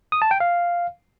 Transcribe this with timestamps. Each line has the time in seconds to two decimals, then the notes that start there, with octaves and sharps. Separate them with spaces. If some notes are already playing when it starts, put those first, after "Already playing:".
0.12 D#6
0.22 A5
0.31 G5
0.40 F5